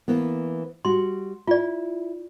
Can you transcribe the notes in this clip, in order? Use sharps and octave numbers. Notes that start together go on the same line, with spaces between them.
E3 A#3 B3
G3 F#4 C6
E4 F4 D5